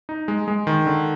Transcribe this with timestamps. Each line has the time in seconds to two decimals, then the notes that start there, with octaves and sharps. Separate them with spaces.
0.09 D#4
0.28 G#3
0.48 G#3
0.67 D#3
0.86 D3